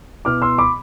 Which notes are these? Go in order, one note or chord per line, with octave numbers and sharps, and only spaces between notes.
B2 B3 E4 D6 F6
C6 E6
B5 D6